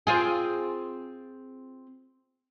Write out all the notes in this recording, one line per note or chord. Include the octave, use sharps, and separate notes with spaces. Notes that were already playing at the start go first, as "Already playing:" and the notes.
C4 F4 G#4